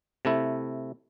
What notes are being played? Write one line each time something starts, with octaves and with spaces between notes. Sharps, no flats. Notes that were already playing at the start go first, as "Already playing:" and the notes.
C3 A3 E4